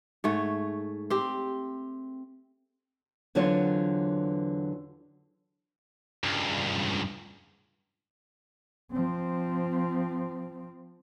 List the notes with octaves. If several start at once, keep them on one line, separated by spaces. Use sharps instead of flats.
G#2 A3 C#5
C4 G4
E2 D3 F#3 C4 F4 C#5
C#2 G2
F3 C4